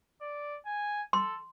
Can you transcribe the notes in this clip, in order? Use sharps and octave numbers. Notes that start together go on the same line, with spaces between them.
D5
G#5
A4 C6